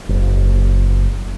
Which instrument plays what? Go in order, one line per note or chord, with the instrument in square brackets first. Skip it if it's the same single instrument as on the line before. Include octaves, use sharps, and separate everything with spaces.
[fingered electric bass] F#1